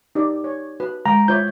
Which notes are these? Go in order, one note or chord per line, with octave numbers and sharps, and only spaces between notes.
D#4 G4 D5
C#5
F#4 B4
G#3 G5 A#5
E4 F4 C5 C#5 B5 G6